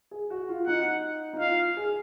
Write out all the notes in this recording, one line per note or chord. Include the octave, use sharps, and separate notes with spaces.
G#4
F#4
F4
D#4 F#5
D#4
F4 F5
G#4